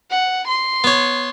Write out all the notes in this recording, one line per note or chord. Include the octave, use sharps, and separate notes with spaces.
F#5
C6
B3 C#5